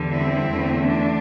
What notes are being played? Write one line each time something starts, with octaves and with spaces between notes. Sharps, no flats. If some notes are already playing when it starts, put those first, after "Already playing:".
Already playing: E2 D3 G3
C4 E4
E2 D3 A3
D4